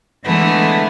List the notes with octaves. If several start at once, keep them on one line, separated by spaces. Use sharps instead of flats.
D3 E3 G#3 A3 B3